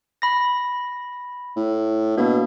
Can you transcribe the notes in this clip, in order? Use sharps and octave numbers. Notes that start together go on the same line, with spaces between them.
B5 A#6
A2
B2 A#3 D4